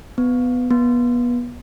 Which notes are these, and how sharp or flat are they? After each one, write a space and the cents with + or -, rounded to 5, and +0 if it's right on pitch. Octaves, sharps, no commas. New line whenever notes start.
B3 +10
B3 -30